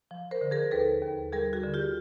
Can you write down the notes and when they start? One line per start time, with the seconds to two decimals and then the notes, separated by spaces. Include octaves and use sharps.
0.11 F3
0.31 A#4 C5
0.41 D3
0.51 G#4 A#4
0.71 D#2 A4 B4
1.02 D#2
1.32 G3 G#4 A#4
1.53 F#4 G#4
1.63 D3
1.74 F4 G4